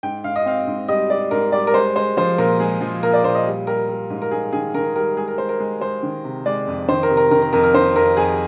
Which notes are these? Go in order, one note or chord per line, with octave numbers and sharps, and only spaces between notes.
G#2 G5
G#2 F5
D#5
C4 F5
G#2
G3 D#5
G3 D5
G#2 A#4
G3 D5
A#4
G#3 C5
G#3 C5
F3 C5
A#2 A#4
G#3 G#4
F3
A#2 A#4
D5
A#2 C5
D#5
G3
G3 A#4
G3
G#2
A#4
G#2 G#4
D#3 G#4
D#3 A#4
G3 A#4
G#3 G#4
A#4
G#3 C5
A#4
G#3
G#3 C5
D#3
C3
G#3 D5
F2
D#3 C5
A#4
C3
A#4
D#3 A#4
A#4
F2 A#4
A#4
D#3 C5
F2 A#4
F2 G#4